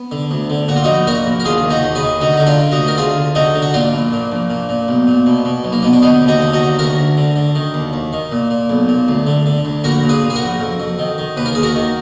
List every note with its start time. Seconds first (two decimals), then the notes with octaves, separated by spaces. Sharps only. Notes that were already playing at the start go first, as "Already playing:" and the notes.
Already playing: B3
0.11 D3
0.31 D2
0.50 D3
0.68 A#2 F#4
0.76 F4
0.84 A#1 D#4 F#4
1.07 A#2 F#4 A#4
1.26 A#1
1.40 A#4
1.45 D#2 F4 G#4
1.64 D#2
1.70 D#4 F#4
1.83 D#2
1.95 G#4 B4
2.03 D#3
2.21 D2 D#4 F#4
2.37 D3 D#4
2.46 D4 F4
2.59 D3
2.72 D#4 F#4
2.78 D2
2.88 A#4
2.97 D2 F4 G#4
3.17 D2
3.35 D3 D#4 F#4
3.55 D3
3.62 F#4
3.73 A#2 D4 F4
3.93 A#1
4.13 A#2
4.32 A#1
4.50 A#2
4.69 A#2
4.88 B1
5.07 A#2
5.26 B2
5.45 B2
5.64 B1
5.72 A#3
5.82 B2 B3
5.93 D4
6.02 D3 B3 D#4
6.22 D#2
6.28 D#4 F#4
6.41 D3
6.53 D#4 F#4
6.60 D#2
6.79 D2 F#4 A#4
6.98 D2
7.17 D3
7.36 D3
7.55 D#3
7.74 D#2
7.93 D#2
8.13 D#3
8.32 A#2
8.50 A#2
8.69 B1
8.88 A#2
9.08 D2
9.27 D3
9.46 D3
9.65 D2
9.84 A#1 F#4 A#4
10.03 A#2
10.09 G#4 B4
10.22 A#2
10.30 G#4
10.35 F#4 A#4
10.42 A#1
10.60 F2
10.80 F2
10.99 D#3
11.18 D#3
11.37 D#2 B4
11.46 A#4
11.55 D#2 G#4
11.63 F#4 A#4
11.75 D#3